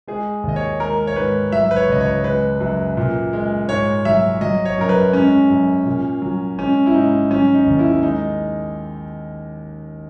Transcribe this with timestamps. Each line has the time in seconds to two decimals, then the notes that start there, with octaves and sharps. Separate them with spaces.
0.07 G#3 G#4
0.44 D#2
0.49 D#5
0.56 C#5
0.80 G#3 A#4
1.07 C#5
1.16 G#2 B4
1.52 F#3 E5
1.71 B4
1.76 C#5
1.89 C#2 D#5
2.01 C#5
2.24 G#3 B4
2.61 F#2
2.97 A#2
3.33 G#3
3.69 G#2 C#5
4.05 F#3 E5
4.41 F#3 D#5
4.65 C#5
4.78 F#2 A#4
4.89 B4
5.13 G#3 C#4
5.50 F#2
5.86 A#2
6.22 F#3
6.59 G#3 C#4
6.86 E4
6.94 G#2 D#4
7.31 F#3 C#4
7.54 D#4
7.66 D#2
7.79 E4
8.03 G#3 D#4